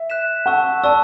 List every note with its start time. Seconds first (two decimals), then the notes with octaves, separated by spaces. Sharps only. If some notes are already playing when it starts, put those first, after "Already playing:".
Already playing: E5
0.10 F#6 B6 E7
0.46 F#5 A5 C#6 E6
0.84 D5 A5 C#6 E6